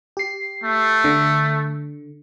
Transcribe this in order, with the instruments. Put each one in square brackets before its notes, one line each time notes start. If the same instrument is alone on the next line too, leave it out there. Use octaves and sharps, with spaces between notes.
[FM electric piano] G4 C7
[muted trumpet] A3
[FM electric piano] D3